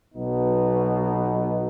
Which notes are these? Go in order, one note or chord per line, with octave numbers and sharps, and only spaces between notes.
B1 B2 B3 D#4